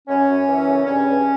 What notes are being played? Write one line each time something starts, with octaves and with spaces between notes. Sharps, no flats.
F#2 C#4
F#2
E3
C#3
G2 C#4
G2